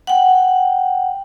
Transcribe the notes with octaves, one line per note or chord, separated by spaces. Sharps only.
F#5 G5